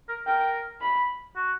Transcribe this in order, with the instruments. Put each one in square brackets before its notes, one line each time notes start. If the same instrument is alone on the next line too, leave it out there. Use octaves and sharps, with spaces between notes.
[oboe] A#4
[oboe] A#4 [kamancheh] G5
[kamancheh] B5
[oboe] F#4